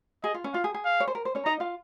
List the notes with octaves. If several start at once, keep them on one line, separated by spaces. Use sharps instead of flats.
G#4 D#5
F4
C#4
F4 F5
G#4
G#4
F5
C#5
C5
A#4
C5
C#4 C#5
D#4 D#5 A#5
F4 F5